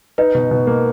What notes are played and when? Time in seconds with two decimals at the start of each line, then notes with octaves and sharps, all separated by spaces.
0.18 D#4 B4
0.35 B2
0.51 B2
0.67 A#3